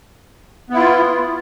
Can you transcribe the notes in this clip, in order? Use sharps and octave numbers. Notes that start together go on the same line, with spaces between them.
B3 E4 F4